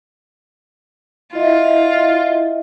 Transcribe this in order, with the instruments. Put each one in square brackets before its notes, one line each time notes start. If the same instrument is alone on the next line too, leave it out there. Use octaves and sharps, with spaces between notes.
[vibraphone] E4 D#5 E5 [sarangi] F4